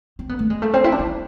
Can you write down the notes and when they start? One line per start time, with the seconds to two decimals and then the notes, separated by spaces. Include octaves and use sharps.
0.19 C4
0.29 B3
0.39 A3
0.50 G#3
0.62 A3
0.73 C4
0.84 E4
0.92 D4
0.99 E4